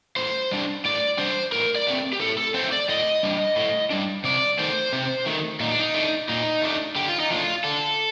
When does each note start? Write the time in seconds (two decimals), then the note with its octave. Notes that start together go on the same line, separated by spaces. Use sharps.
0.16 A2 C5
0.51 G3 D4
0.85 A2 D5
1.18 G3 D4 C5
1.52 A2 A#4
1.75 D5
1.87 A3 C4
2.13 G4
2.20 A2 A4
2.38 A4
2.54 A3 C4 C5
2.72 D5
2.89 A2 D#5
3.23 G3 D4
3.56 A2
3.90 G3 D4
4.24 C3 D5
4.59 D#3 A3 C5
4.93 C3
5.26 D#3 A3
5.60 A#2 D#4
5.71 D4
5.79 D#4
5.94 A3 D4
6.29 A#2 D#4
6.62 A3 D4
6.96 D3 G4
7.08 F4
7.20 D#4
7.30 F3 A3 D4 F4
7.64 D3 A4